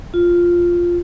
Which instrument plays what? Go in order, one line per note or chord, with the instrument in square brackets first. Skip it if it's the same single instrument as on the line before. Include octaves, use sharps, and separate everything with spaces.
[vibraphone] F4